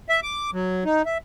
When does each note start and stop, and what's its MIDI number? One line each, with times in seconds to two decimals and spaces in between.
0.09 0.20 76
0.23 0.51 86
0.53 0.84 54
0.85 1.02 63
1.06 1.18 76